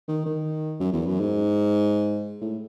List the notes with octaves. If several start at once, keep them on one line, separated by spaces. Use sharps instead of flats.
D#3
D#3
F#2
E2
F#2
G#2
A2